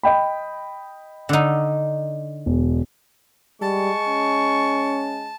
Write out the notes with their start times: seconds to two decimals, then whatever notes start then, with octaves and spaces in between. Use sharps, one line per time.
0.03 D#5 G5 B5
1.29 D3 D#4
2.46 E1
3.61 G3 G#3 A5 C#6
4.08 C#4